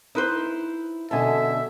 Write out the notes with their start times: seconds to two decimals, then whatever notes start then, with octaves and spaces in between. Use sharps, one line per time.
0.15 D#4 E4 B4 C5
1.11 F#2 B2 D3 A4 E5 G#5 A5